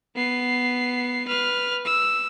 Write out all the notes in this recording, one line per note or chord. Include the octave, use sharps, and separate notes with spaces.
B3 C7
B4 F6
E6